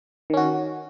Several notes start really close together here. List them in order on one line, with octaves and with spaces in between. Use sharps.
D#3 C#4 F#4